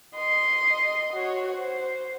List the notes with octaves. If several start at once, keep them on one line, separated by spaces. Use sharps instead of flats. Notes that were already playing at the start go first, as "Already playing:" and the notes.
D#5 C6
F#4 C#5
C5